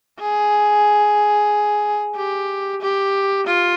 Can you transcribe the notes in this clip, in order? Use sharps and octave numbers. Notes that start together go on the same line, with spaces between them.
G#4
G4
G4
F4